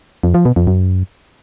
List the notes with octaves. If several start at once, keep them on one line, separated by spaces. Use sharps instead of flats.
F2
F3
B2
F2
F#2